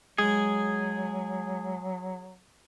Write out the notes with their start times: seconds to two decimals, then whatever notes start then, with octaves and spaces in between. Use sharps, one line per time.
0.18 F#3 G#3 G#4